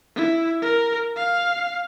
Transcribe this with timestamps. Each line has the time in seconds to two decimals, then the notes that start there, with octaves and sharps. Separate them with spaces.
0.16 E4
0.62 A#4
1.16 F5